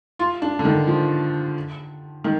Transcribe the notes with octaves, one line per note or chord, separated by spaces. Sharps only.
F4
D4
D3
D#3
F3
D#3